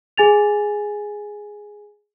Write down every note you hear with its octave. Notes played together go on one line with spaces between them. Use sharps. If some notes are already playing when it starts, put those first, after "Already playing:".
G#4 G#5 A6 F7